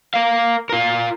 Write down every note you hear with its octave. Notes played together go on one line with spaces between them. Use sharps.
A#4 F5
F4 A#4